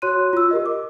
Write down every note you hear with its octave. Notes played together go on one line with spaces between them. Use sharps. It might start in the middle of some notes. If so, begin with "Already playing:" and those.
F#4 C#5 C6 F#6 D#7
F4 E6
G4 A#4 D#5
D6